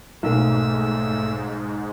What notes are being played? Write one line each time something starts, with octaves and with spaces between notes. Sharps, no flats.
B1 G#2 A3 A#3 E6